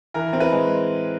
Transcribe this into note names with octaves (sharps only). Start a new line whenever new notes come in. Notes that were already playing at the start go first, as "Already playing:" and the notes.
E3 A#4
C4
B4
G#3